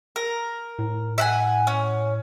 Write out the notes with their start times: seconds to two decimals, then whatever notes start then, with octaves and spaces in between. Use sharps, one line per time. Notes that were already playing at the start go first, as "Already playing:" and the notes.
0.16 A#4
0.79 A2
1.18 E5 F#5 G#5
1.67 C#4